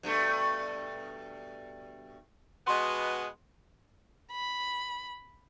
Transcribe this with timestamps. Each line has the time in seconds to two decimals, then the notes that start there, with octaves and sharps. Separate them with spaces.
0.03 G2 B2 A3
2.67 B2 G#3 B3 C6
4.32 B5